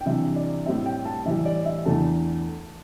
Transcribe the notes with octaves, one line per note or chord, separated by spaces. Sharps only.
G5
C3 E3 G3 D4 E5
D5
A2 G3 C4 E5
G5
A5
A2 E3 G3 E5
D5
E5
E2 E3 A3 D4 A5